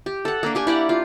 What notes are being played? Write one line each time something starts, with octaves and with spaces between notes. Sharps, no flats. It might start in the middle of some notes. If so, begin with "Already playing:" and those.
G4
A4 F#5
A#3 D4
A#3 G4 G#5
E4 G4 D5 F#5
F4